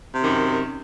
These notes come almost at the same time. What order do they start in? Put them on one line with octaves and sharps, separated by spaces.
C3 D#3 F#2